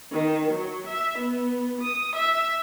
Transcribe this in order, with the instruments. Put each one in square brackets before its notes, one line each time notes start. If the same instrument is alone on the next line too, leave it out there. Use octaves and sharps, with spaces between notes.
[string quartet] D#3
F#3
E5
B3
D#6
E5